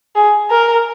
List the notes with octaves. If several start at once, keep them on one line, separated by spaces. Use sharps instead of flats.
G#4
A#4